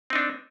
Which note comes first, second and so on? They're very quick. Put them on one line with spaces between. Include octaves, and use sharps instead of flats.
C4 D#4 D4